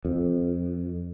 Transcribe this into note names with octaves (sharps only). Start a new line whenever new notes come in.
F2